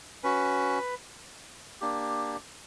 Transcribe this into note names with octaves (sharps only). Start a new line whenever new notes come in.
C#4 F#4 B4
A#3 D4 G4